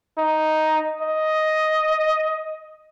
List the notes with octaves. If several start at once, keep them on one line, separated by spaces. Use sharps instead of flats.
D#4
D#5